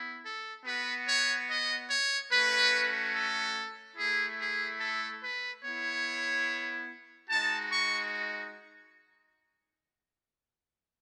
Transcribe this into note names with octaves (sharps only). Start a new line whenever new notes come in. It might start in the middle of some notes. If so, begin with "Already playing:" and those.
Already playing: B3 E4
A4
B3 F#4 B4
C#5
D#5
C#5
A3 C#4 F#4 B4
A4
A3 E4 G#4
G#4
A4
B4
B3 E4 C#5
G#3 D#4 F#4 A5
C#6